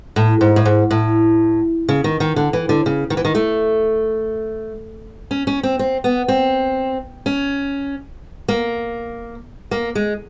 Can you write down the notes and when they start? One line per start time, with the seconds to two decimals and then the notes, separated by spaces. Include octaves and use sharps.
0.16 A2
0.41 G#2
0.56 A2
0.65 G#2
0.91 A2
1.89 C#3
2.04 D#3
2.20 D#3
2.36 D3
2.53 E3
2.69 D3
2.86 C#3
3.10 D#3
3.17 E3
3.25 D#3
3.35 A3
5.31 C#4
5.47 C#4
5.63 C4
5.79 C4
6.04 B3
6.28 C4
7.26 C#4
8.48 A#3
9.71 A#3
9.95 G#3